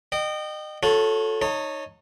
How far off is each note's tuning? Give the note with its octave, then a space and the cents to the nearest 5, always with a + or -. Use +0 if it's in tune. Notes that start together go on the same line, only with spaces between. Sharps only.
D#5 -30 G5 -15
F#4 -40 A4 +0 C#5 +0
D#4 +0 C#5 -5 A5 +35